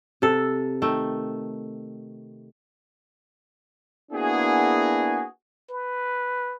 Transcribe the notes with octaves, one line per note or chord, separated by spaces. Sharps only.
C3 A4
D#3 A3 G5
A#3 B3 D4 E4 F#4 G#4
B4